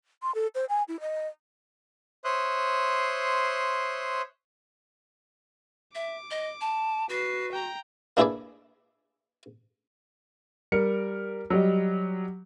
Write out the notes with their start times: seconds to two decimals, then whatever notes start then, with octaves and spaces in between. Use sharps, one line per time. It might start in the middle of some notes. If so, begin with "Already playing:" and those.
0.23 C6
0.35 A4
0.55 C5
0.69 G#5
0.88 E4
1.01 D#5
2.24 C5 C#5 E5 C6 D#6 F#6
5.95 E5 D6
6.30 D#5
6.61 A5
7.09 F#4 B4 C7
7.52 G5 A#5
8.17 A#3 D4 E4 G#4 B4 D5
10.72 G3 A#4 C#7
11.50 F#3 G3 G4 D#5